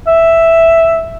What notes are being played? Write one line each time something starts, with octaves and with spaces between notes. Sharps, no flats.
E5